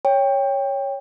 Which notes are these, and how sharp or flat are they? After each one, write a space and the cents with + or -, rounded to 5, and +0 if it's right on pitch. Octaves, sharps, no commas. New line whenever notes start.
C#5 +0 G5 +15